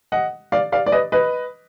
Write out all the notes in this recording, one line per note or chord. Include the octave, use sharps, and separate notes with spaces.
D#5 F#5
D5 F5
D5 F5
D5
B4 D#5
B4 D#5